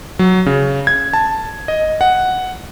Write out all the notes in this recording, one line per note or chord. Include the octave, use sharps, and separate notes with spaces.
F#3
C#3
G#6
A5
D#5
F#5